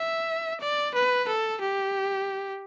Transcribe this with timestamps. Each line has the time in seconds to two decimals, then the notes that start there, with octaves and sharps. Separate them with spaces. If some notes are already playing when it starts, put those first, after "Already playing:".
Already playing: E5
0.60 D5
0.94 B4
1.28 A4
1.61 G4